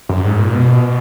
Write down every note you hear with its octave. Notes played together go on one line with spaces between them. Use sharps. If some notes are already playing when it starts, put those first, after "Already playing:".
F#2
G#2
A#2
B2